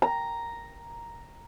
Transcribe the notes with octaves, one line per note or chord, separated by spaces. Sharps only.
A#5